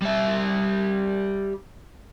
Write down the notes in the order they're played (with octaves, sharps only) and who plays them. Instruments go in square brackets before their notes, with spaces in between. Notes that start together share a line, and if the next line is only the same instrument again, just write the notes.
[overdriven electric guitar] G3 E5